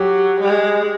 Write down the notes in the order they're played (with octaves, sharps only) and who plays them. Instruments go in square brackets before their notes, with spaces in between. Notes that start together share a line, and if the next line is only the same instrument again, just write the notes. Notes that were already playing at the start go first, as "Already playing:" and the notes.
Already playing: [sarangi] F#3 [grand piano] G4
[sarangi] G#3